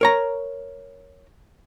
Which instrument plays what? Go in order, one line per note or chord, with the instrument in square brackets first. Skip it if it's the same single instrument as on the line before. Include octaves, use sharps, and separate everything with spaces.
[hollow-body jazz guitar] A#4 C#5 A#5